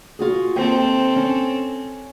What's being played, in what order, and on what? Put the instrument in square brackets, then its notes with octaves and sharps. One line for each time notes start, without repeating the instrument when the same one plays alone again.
[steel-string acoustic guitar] F4 F#4 G#4
[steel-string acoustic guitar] D#2 C5 G5 [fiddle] C4 A4
[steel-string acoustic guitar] C#4